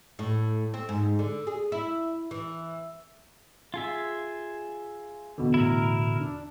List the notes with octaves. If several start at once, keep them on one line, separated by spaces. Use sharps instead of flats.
A2
C4
G#2
D3
G#4
E4
E3
F4 G#4 E5
E2 B2 D3
A2 E4 A#4
D4